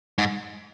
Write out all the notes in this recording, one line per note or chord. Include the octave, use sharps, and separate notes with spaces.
G#2